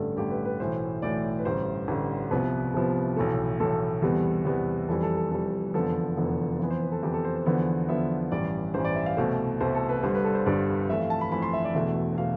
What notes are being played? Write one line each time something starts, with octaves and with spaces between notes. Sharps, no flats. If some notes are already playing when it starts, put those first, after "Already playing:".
Already playing: A1 G2 D3 A3 A4
A1 G2 D3 A3 G4
B4
B4
B1 A2 E3 A3 C5
B1 A2 E3 A3 D5
B4
A1 G2 D3 C5
A1 G2 D3
C2 C3 F3 B3 B4
C2 C3 F3 B3
B1 A2 E3 A3 A4
B1 A2 E3 A3 A4
E2 C3 G3 B3
E2 C3 G3 B3
F1 F2 E3 G3 A4
A4
A4
F1 F2 E3 G3 A4
F1 E2 D3 F3 B3 A4
F1 E2 D3 F3 B3
F2 E3 B3
C5
B4
A4
F2 E3 B3 G4
A4
C5
C5
E2 D3 F3 B3
E2 D3 F3 B3 E5
A1 G2 E3 D5
A1 G2 E3 C5
D5
E5
F5
C2 B2 A3 C5
C2 B2 A3 C5
A4
B4
G1 G2 D3 G3 C5
B4
A4
C5
G1 G2 D3 G3 D5
F2 E3 A3 E5
F5
A5
B5
F2 E3 A3 B5
C6
E5
D5
E1 E2 B2 A3 E5
B2 A3 F5